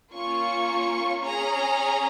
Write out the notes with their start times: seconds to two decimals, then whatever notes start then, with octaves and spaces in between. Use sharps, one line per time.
0.13 A#3 C#4 F4 C#6
1.22 C#4 G#4 A#5